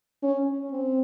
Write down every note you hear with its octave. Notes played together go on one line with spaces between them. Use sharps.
C#4
C4